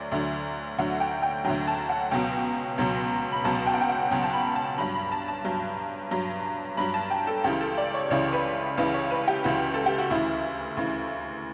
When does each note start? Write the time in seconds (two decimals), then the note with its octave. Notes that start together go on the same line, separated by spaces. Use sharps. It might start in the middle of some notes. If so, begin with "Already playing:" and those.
Already playing: D2 F#3 D5
0.12 D2 D3 F#3
0.78 D2 D3 F#3 F#5
1.00 G5
1.22 G5
1.45 D2 D3 F#3 G5
1.67 A5
1.89 F#5
2.11 C#2 B2 F#3 G5
2.78 C#2 B2 F#3
3.32 B5
3.44 C#2 B2 F#3 A5
3.67 G5
3.74 F#5
3.81 G5
3.89 F#5
4.11 C#2 B2 F#3 G5
4.23 A5
4.33 B5
4.56 A5
4.78 G2 F#3 B5
4.94 B5
5.12 A5
5.28 A5
5.45 G2 F#3
6.11 G2 F#3
6.77 G2 F#3 B5
6.94 A5
7.11 G5
7.27 A4
7.44 C#2 C#3 E3 G4
7.61 A4
7.78 D5
7.94 C#5
8.11 C#2 C#3 E3 C#5
8.33 B4
8.77 C#2 C#3 E3 B4
8.94 C#5
9.11 B4
9.28 G4
9.44 C#2 C#3 E3 F#4
9.74 A4
9.86 G4
9.98 F#4
10.11 D2 C#3 E3 E4
10.77 D2 C#3 E3